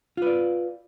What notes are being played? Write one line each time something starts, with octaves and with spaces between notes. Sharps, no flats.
F4 B4 D5